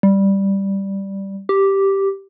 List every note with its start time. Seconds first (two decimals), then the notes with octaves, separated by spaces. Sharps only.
0.03 G3
1.49 G4